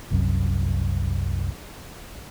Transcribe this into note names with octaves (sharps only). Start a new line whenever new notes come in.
F#1 C2 F#2